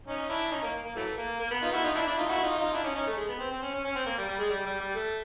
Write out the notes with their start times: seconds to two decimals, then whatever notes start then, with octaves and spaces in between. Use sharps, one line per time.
0.06 C#4 D#4
0.29 D4 E4
0.51 C#4 D#4
0.63 A#3
0.85 A#3
0.96 E3 F#3 A3
1.18 A#3
1.40 A#3
1.51 B3
1.62 D#4 F4
1.73 E4 F#4
1.84 D#4 F4
1.95 D4 E4
2.07 D4 E4
2.17 D#4 F4
2.29 E4 F#4
2.43 D#4 F4
2.58 D#4 F4
2.73 D4 E4
2.84 C#4 D#4
2.95 C#4 D#4
3.07 A3
3.17 G#3
3.28 B3
3.39 C4
3.51 C4
3.62 C#4
3.73 C#4
3.84 C#4
3.96 C4
4.06 A#3
4.18 G3
4.28 G3
4.39 G#3
4.50 G3
4.65 G3
4.80 G3
4.95 A3